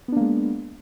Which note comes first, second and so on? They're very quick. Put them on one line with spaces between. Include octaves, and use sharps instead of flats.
B3 D4 A#3 G#3